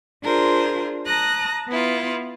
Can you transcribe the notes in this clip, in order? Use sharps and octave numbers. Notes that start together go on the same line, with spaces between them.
D4 F4 G#4 A#4 C5
A5 A#5 D#6 F#6 A#6
B3 E4 F4